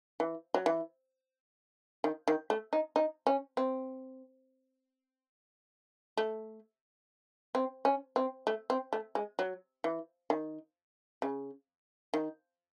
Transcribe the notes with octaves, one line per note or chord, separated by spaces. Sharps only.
E3
F#3
E3
D#3
D#3
A3
D#4
D#4
C#4
C4
A3
C4
C#4
C4
A3
C4
A3
G#3
F#3
E3
D#3
C#3
D#3